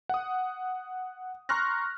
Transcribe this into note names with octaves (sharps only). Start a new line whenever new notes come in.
F#5 D#6
A#5 C6 C#6 F6 F#6 A#6